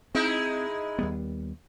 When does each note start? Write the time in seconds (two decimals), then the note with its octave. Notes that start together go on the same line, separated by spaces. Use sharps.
0.15 G#3 C4 D#4 E4
0.99 D#2 G3 B3